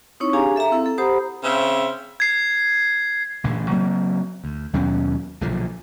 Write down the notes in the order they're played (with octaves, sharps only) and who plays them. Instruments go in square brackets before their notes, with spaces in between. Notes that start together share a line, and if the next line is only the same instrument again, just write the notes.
[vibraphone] C4 D#4 E4 C#5 C#6
D4 G4 G#4 F5 G#5 A#5
A4 E5 F5 A#5
C4 E4 A4
A4
G4 C5 F#5 A#5 B5 D#6
[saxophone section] C#3 C4 E5
[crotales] G#6 C7
[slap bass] A1 A#2 D3 E3
C#3 F#3 A#3 C4
D2
D#2 B2 F#3 C#4
B1 A#2 D3 F3